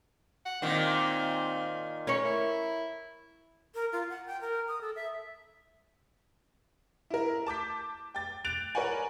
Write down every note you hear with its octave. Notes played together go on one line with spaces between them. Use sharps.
F#5
A#2 D#3 C4
C#4 A#4 C#5
E4
A#4
F4
F#5
G5
A#4
D#6
A4
E5
E4 A#4
A5 D6 G6 B6
G5 A6
F#6 G6 A6 D7 F7
A#4 B4 C#5 D5 F#5 G#5